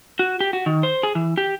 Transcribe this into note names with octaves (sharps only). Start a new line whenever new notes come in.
F#4
G4
F#4
D#3
C5
G#4
E3
G4